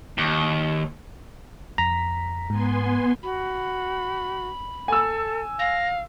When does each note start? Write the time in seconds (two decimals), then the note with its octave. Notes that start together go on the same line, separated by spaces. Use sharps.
0.18 D#2
1.78 F2 A#5 B6
2.50 G#2 B3 G#5 C6
3.23 F#4 B5
4.88 A4 G#5 E6
5.59 F5 A#6